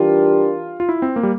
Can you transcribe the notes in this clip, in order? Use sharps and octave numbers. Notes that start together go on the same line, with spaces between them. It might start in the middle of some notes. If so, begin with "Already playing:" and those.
Already playing: E3 G3 D4 F4 G4 A#4
F4
E4
C4
A#3
G3